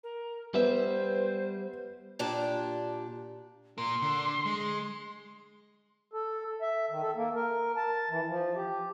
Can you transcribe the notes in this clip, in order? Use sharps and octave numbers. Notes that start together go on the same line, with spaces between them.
A#4
G3 B3 C5 E5
A#2 D4 G4 A5
A#2 A#4 C6
D3
G#3
A4
E5
D#3
A4
A#3
A#4
A5
E3
F3
G4